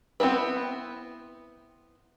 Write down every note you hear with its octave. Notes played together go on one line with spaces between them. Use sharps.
B3 C4 E4 A#4 B4